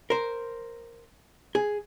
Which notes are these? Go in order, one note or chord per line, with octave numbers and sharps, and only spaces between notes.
A#4 C5
G#4